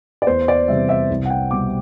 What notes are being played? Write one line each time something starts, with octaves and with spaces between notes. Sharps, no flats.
D5
E2 C5
D5
C3 E3 G3 E5
E5
C2
F#5
G5
B2 G3 D6